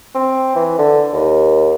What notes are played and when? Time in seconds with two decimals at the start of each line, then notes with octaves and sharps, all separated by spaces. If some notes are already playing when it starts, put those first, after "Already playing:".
0.15 C4
0.55 E3
0.78 D3
1.13 D#2